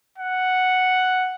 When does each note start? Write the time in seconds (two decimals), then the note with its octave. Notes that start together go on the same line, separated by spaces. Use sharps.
0.18 F#5